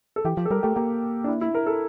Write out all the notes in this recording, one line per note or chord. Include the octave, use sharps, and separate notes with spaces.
A4
E3 G4
F3
A4
G3 A#4
A3 G4
A#3 G4
D4
E4
E4
A#4
A4